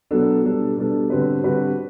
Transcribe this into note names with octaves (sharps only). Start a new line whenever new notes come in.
B2 F#3 B3 D4 A4
B2 G3 D4 A4
B2 G3 D4 A4
D3 G3 C4 F#4 B4
D3 G3 C4 F#4 B4